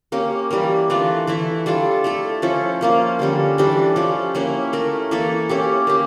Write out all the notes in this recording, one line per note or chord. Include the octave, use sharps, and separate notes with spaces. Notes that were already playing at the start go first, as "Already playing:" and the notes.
A#3 C#4 G4
E3 G3 A#3
E3 A3 D4 F4
E3 A3 E4
G3 D4 F4 A4
A3 E4 A4
F3 C#4 E4
F3 A#3 C#4
D3 G3 C#4
E3 G3 D4 A4
F3 C#4 G4
A#3 C#4 E4
A3 E4 A#4
E3 A#3 E4 A4
A#3 C#4 E4 G4
A#3 C#4 G4